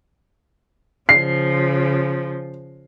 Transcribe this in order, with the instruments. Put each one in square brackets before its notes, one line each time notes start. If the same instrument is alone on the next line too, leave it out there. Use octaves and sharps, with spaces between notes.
[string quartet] C#3 F3 [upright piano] C7